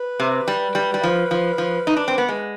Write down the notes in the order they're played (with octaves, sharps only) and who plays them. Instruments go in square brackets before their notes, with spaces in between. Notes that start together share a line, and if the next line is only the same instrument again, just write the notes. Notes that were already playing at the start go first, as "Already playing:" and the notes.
Already playing: [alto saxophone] B4
[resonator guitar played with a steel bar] C3
G3
G3
G3
F3
F3
F3
D#4
D4
C4
B3
G#3